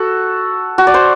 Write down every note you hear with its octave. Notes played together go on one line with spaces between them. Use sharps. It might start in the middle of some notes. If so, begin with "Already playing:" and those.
Already playing: F#4 A4
F#4
D5
C5